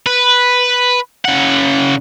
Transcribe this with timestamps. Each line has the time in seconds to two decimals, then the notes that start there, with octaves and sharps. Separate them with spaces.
0.06 B4
1.25 C#3 F#5